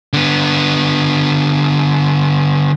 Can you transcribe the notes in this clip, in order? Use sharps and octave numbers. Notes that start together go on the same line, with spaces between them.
D3 B3